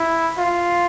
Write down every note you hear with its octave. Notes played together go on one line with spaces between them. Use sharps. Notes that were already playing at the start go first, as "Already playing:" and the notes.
Already playing: E4
F4